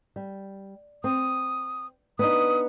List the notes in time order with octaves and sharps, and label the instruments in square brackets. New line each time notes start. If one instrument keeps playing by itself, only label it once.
[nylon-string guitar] G3
[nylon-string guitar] C4 [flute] D#6
[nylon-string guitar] B3 D4 D#4 [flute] D#6